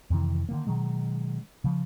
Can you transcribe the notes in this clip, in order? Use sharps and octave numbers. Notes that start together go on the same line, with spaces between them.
F2 C3 D#3 E3
D3 D#3 A#3
B2 D#3 F#3 G#3
C#3 F3